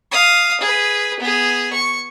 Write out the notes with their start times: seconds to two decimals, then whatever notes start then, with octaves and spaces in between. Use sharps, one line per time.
0.12 F5 D#6
0.61 G#4 B4
1.20 B3 G#4
1.73 C#6